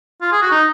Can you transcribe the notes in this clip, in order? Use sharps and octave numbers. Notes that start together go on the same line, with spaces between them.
F4
G#4
F#4
D#4